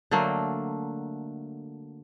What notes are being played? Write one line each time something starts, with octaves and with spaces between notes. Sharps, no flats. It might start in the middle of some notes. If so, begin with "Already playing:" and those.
D3 F#3 A3 A#3